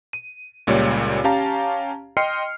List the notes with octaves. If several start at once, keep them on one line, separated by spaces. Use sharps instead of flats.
D#7
C#2 A#2 G3 C#5 D5
C#4 G4 F5 A5 A#5
D#5 G5 C6 F6 C7 C#7